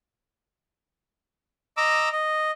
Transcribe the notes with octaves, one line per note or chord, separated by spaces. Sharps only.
D#5 A#5 D6 E6
D#5